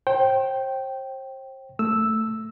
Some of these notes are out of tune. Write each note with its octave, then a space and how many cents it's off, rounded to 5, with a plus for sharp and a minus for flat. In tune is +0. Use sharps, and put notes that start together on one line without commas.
C5 +35 G5 -10
A3 +10 E6 +0